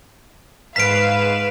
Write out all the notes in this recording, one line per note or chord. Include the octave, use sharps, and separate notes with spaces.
G#2 B4 F5 B6 D7 E7